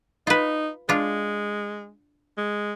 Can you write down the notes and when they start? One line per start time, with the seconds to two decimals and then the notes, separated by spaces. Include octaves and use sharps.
0.27 D#4 F4 B4
0.89 G#3 D4 F4
2.37 G#3